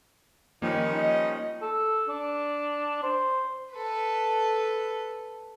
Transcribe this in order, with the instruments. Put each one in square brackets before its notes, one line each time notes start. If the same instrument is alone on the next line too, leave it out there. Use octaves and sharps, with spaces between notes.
[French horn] D#3 [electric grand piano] F3 A#3 [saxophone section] G3 C#4 D#4
[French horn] D#5
[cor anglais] A4
D4
C5
[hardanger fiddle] A4 B4